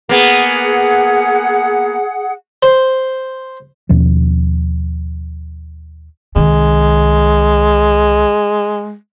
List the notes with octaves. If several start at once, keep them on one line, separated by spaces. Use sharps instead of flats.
A#3 B3 G#4 F#5
C5
D#2 B2 F3 C#4
C2 D#3 G#3